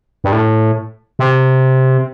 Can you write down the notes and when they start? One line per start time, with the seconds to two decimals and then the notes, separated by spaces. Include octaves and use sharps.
0.24 G2
0.32 A2
1.19 C3